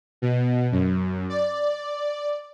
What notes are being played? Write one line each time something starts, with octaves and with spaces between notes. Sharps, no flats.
B2
F#2
D5